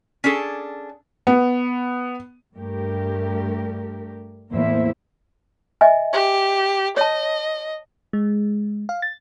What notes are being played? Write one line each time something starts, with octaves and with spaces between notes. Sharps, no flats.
C#4 D4 G#4 A4
B3
G2 A3 G4 A#4
E2 A2 A#3 E4 C5 E5
D#5 E5 G#5
G4
C#5 D#5 A5
G#3
F5
A6